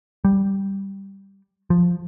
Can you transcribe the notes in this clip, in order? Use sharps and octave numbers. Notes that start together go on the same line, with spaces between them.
G3
F3